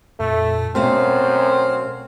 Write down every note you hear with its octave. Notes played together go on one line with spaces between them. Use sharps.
F2 A#2 A3
F#2 B2 A3 C4 C#5 F5 F6